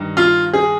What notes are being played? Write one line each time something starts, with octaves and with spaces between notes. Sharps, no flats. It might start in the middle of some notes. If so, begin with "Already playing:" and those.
Already playing: G2 D#3
F4
G#4